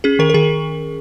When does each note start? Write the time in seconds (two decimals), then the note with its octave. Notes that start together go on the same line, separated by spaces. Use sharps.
0.04 C#4 G#4
0.19 D#3 A#4
0.30 A#4
0.34 D#3 G#4